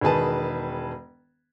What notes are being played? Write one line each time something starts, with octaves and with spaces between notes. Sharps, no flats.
E1 D#3 G#4 B4 A5